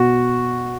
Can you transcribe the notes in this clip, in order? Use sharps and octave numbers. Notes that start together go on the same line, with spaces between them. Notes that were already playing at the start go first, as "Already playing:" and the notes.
Already playing: B2 F#4